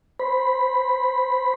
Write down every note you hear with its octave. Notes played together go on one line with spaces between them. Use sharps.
C5 B5